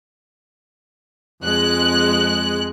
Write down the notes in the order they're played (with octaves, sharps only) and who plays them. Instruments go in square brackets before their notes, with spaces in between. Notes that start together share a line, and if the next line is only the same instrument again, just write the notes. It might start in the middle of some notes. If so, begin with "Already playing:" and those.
[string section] F2 G#3 F#6